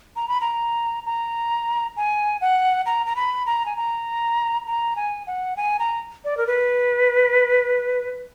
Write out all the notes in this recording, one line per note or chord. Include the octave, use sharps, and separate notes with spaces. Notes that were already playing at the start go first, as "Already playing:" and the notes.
A#5
B5
A#5
A#5
G#5
F#5
A#5
A#5
B5
A#5
G#5
A#5
A#5
G#5
F#5
G#5
A#5
D5
A#4
B4